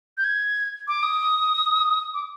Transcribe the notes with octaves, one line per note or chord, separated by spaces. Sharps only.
G6
G#6
D6
D#6
D6